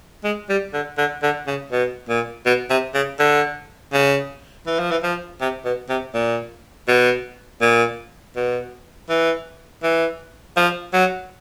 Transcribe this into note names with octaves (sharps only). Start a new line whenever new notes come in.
G#3
G3
D3
D3
D3
C#3
B2
A#2
B2
C3
C#3
D3
C#3
E3
F3
E3
F3
C3
B2
C3
A#2
B2
A#2
B2
E3
E3
F3
F#3